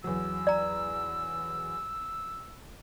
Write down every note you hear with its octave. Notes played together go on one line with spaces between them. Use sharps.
E2 F#3 E6
D5 A#5